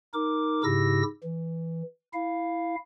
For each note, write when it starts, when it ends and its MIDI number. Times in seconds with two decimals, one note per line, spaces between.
0.14 0.63 63
0.14 0.63 70
0.14 0.63 86
0.64 1.03 44
0.64 1.03 49
0.64 1.03 64
0.64 1.03 67
0.64 1.03 88
0.64 1.03 94
1.23 1.82 52
2.13 2.75 64
2.13 2.75 77